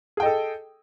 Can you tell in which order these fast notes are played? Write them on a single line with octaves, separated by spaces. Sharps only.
G#4 G5 D#5 A4